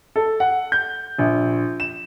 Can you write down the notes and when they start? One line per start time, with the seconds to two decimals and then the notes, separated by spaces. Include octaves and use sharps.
0.16 A4
0.40 F#5
0.72 G6
1.19 A#1
1.80 E7